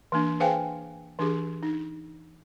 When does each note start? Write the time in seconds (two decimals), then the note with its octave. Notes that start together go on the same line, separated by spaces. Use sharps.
0.12 E3 A#3 D4
0.40 G#4 B4 C5 F5 G5 G#5
1.19 E3 D4 G4 G#4
1.63 D#4